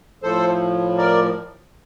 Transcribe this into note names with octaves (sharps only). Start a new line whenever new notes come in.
A2 F3 A4 C5
A#4 D5